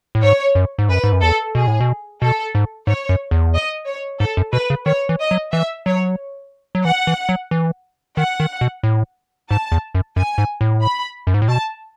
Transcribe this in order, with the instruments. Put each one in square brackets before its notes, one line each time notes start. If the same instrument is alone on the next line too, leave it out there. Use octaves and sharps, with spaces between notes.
[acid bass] A2
[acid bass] G#2 [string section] C#5
[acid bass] F#2
G#2
[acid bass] F#2 [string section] B4
[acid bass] G#2
F#2
[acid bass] E2 [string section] A4
[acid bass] B2 [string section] G#4
[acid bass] A2
B2
[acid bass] B2 [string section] A4
[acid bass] G#2
[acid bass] G#2 [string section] C#5
[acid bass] F#2
E2
[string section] D#5
C#5
[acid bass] G#2 [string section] A4
[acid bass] F#2
[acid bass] B2 [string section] B4
[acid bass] C#3
[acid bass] D#3 [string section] C#5
[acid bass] E3
[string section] D#5
[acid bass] F#3
[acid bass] E3 [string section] E5
[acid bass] F#3 [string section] C#5
[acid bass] F#3
[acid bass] E3 [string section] F#5
[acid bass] E3
F#3
E3
[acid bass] D#3 [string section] F#5
[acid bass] D#3
B2
A2
[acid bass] G#2 [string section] A5
[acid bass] E2
F#2
[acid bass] F#2 [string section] G#5
[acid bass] G#2
A2
[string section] B5
[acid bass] F#2
G#2
A2
[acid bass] B2 [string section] A5